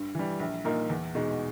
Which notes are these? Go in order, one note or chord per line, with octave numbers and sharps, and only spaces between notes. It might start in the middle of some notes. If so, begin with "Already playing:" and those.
Already playing: G2
E3 G3
A#1
A#2 A#3 D#4
E2
B2 G#3 D#4